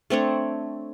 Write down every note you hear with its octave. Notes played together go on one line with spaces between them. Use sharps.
A3 C4 D4 C#5